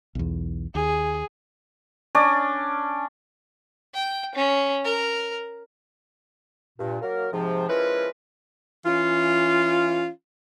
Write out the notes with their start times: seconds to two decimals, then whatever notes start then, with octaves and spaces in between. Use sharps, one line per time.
0.15 B1 E2
0.75 D#2 G#4
2.15 C#4 D4 D5
3.94 G5
4.35 C#4
4.85 A#4
6.79 G2 A#2
7.02 F#3 A#3 A#4
7.32 G#2 C3 F3
7.69 F3 G#3 C#4 E4 A#4 B4
8.86 E3 C#4 F4